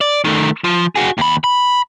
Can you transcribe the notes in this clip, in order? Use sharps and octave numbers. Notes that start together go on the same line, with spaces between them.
D5
D#3 A3
F3
F#4 G#4
D#2 B5
B5